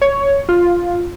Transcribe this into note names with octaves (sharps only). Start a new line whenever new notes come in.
C#5
F4